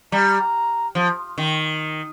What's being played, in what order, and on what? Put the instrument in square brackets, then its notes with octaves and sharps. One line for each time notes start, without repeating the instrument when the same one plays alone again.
[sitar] G3 [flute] A#5
[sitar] F3
D#3